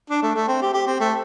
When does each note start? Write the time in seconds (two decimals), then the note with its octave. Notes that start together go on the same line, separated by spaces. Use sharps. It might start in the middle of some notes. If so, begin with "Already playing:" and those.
0.10 D4
0.23 A3
0.36 A3
0.48 C4
0.62 G4
0.74 G4
0.87 C4
1.00 A3